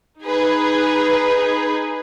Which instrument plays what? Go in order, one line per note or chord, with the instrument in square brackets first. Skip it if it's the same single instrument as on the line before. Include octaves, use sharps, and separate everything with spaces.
[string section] D#4 G#4 B4